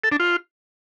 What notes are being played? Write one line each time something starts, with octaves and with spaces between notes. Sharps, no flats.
A4
D4
F4